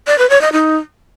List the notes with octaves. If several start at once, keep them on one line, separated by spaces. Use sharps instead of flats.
D5
B4
C#5
D#5
D#4